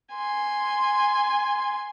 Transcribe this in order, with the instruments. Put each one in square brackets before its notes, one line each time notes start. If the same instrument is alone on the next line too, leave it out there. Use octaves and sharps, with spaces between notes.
[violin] G#5 C6